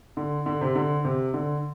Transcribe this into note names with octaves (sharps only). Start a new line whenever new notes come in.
D3
D3
C3
D3
C3
D3